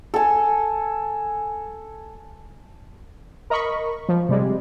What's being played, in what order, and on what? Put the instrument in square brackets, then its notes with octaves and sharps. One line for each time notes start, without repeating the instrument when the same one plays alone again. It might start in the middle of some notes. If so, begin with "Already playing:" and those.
[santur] A4 G#5
[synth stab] A#4 D#5 B5 C#6
F3
C3 G3 G#3